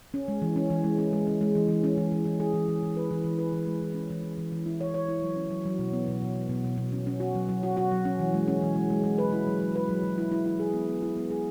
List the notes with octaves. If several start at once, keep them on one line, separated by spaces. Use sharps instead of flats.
C#4
G#3
E3
C#4
E3
G#3
C#4
G#3
C#4
G#3
E3
E3
C#4
E3
E3
E3
G#4
E3
E3
E3
B4
E3
E3
B4
E3
G#3
E3
C#4
E3
E3
E3
E3
E4
C#5
C#5
E4
F#3
C#4
F#3
F#3
B2
B3
B2
B2
B3
B2
B2
B2
C#4
C#4
F#4
F#3
F#3
F#4
F#4
F#3
C#4
E3
G#3
C#4
E3
G#3
G#3
G#3
B4
E4
F#3
F#3
B4
F#3
F#3
E4
E4
E4
G#4
B3
B3
E4
B3
G#4